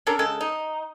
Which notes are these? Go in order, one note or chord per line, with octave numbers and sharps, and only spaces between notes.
C#4 D4 A4 A#4
C#3 G#3 A4
D#4